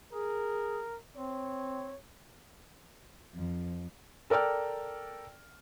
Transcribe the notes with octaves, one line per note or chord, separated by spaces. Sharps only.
G#4 A#4
C4 C#5
F2
A4 A#4 D5 G5 F6